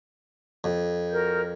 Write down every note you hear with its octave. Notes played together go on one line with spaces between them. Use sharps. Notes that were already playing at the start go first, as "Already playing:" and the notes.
F2
F#4 A#4 G6